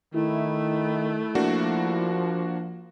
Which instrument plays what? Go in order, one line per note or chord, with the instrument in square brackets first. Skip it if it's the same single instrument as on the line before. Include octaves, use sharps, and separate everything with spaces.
[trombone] D#3 [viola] A3 [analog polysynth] E4
[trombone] F3 [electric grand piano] A#3 D4 F#4